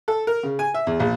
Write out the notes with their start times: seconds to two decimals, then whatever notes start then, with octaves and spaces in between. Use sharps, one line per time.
0.08 A4
0.27 A#4
0.43 C#3
0.59 G#5
0.74 E5
0.87 E2
1.00 A#1